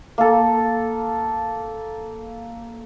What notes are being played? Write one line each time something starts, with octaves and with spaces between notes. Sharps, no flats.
A#3 A4